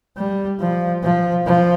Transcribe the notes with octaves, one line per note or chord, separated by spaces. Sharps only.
G3
F3
F3
F3